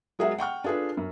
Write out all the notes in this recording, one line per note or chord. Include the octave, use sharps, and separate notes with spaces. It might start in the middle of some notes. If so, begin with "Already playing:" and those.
F#3 G#3 G#4 A#4 E5 F#5
F#5 G5 C#6 F6
D4 F4 G#4 A4 B4
F#2